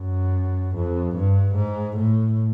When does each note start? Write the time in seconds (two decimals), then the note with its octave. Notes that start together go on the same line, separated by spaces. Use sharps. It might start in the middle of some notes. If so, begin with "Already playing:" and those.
Already playing: F#2
0.75 F2
1.15 G2
1.55 G#2
1.97 A2